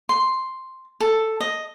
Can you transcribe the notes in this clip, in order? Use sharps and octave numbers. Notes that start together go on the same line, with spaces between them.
C6
A4
D#5